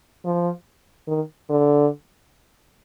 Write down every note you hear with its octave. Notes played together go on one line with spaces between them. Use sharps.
F3
D#3
D3